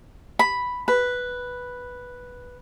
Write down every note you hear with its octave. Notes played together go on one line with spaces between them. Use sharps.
B5
B4